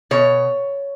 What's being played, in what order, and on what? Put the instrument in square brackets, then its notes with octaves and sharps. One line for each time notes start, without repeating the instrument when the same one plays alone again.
[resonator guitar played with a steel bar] B2 C#5